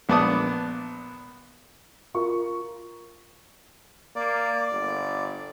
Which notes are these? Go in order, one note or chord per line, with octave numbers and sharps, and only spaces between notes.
A#1 B3 D5 A5 D6 D#6
F4 A#4 C#6
A#3 D5
G1